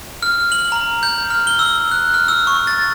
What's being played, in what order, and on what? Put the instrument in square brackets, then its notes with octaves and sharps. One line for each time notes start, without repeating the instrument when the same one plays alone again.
[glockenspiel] F6
F#7
A#5
G6
F6
G7
E6
F#6
F6
E6
C#6
A6